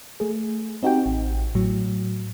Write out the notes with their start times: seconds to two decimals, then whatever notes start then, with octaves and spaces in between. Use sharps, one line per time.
0.20 A3 G#4
0.83 C4 D#4 F#4 G4 G5
1.06 A1
1.55 A2 F#3